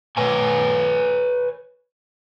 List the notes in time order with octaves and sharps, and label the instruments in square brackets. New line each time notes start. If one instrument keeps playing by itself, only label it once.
[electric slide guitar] B4 C#5 G#5